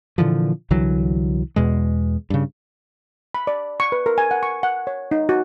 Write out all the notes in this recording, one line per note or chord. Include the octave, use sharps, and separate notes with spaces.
A#2 D3 E3 F3
C2 D3 E3 F#3
E2 B2 G#3
G2 C#3
B5
D5
C#6
B4
A#4
G#5
F#5
C#6
F#5
C#5
D#4
F#4